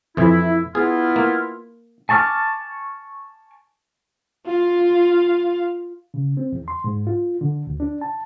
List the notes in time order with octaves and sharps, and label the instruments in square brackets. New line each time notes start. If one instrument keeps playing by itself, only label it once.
[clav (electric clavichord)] F2 E3 [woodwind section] E4
[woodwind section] B3 E4 F4 [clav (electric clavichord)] G#4
[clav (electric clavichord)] A#3
[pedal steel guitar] G#5 A5 C#6 D6 F6
[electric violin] F4 F5
[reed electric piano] C#3
C4
E2
C6
G#2
F4
D3
D2
D4
A5